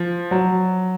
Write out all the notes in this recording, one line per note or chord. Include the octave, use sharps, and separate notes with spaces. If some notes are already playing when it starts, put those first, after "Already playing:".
Already playing: F3
F#3